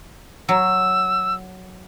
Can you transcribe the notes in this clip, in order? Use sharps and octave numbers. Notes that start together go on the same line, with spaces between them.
F#3 E6